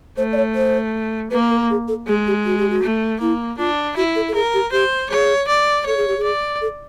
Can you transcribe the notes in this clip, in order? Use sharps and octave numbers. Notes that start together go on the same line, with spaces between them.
A3 C5
D5
C#5
C5
A#3 B4
A#4
G#4
A4
G#3 G#4
G4
F#4
G4
F#4
A3
A#3 E4
D4 F4
E4 F#4
A4
A4
G#4 A#4
G4
G4 C5
G#4 C#5
D5
A4 C#5
G#4
G4
G#4
D5
A4